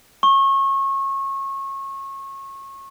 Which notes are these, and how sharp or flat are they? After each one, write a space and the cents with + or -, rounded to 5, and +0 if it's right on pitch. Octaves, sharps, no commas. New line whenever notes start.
C#6 -25